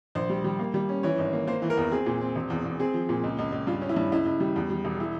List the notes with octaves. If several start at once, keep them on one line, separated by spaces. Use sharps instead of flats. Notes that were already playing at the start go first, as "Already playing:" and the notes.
A#1 C5
G3
G3
A#3
G3
C#4
E3 C#5
G#1
A#3
A#3 C5
E3
A#4
E2
C4 G#4
A#2
C4
E1
E2
E2
C4 G#4
F3
A#2
C#2
C#2
C#2
G2 F4
C#4
E4
G2
C#2 E4
C#2
G3
E2
G3
E1
E4